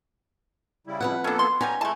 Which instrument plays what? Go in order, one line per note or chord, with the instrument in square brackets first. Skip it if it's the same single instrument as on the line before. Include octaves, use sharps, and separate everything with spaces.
[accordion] C#3 G3 E4
[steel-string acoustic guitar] F2 B4 F#5
[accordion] A#3 B3 A4 [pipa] C#4 D4
[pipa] C6
[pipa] G3 B3 C#4 [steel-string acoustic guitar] G#5 [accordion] A#5
[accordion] G#3 E4 [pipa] A3 A5